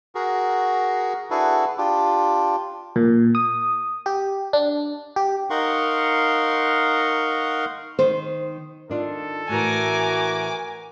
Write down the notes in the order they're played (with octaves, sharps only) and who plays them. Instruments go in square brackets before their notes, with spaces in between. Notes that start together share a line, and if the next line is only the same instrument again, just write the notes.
[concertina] F#4 G#4 A#4
D4 E4 F#4 G#4 A4 B4
D4 F4 G4
[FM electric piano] A#2
D#6
G4
D4
G4
[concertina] D#4 A#4 F5 F#5 C6 C#6
[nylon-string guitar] D#3 C5
[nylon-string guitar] D#3 D4 F4 [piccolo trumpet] A4
[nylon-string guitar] A2 E3 [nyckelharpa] F#4 A#4 [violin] G#5 D6